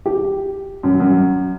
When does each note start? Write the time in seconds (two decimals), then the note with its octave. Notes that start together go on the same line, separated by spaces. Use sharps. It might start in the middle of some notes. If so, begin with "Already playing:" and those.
0.06 G4
0.83 F#2
1.00 F#2